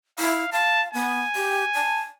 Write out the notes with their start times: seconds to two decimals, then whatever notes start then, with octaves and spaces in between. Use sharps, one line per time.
0.19 E4 F5
0.52 F5 A5
0.93 B3 G#5
1.36 G4
1.74 A5